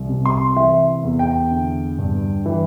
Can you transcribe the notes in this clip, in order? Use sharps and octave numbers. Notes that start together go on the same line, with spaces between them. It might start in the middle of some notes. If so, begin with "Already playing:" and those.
Already playing: C2
C3
C6
E3 E5
E2
G5
D3
G2
E3